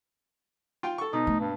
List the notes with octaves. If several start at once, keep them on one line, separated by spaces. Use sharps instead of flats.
F4 G5
A4 C#6
B2 D#4
A3
G2